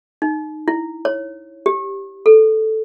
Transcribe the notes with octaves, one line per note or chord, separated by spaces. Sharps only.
D#4
E4
C#5
G4
A4